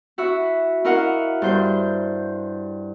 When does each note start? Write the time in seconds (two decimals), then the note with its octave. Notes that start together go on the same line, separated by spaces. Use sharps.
0.18 E4 F#4 E5
0.85 E4 F#4 A#4 D#5 F5 F#5
1.42 G2 C5 G6